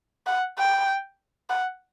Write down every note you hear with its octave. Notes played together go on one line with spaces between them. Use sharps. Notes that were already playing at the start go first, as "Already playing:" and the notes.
F#5
G5
F#5